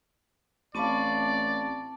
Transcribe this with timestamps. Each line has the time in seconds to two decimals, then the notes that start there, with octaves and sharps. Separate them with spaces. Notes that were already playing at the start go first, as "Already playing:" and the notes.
0.75 A1 C4 D5 F5 A5 B5 C#6 D6